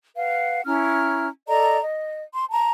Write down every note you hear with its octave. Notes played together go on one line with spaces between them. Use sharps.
B4 F5 F#5
C#4 E4 A#5 F6
A4 D5 D#5 A#5
D#5
C6
A5 A#5